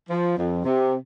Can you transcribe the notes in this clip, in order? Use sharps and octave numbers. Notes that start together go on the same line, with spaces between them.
F3
F2
C3